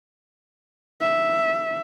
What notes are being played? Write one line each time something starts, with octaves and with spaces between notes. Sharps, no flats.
E5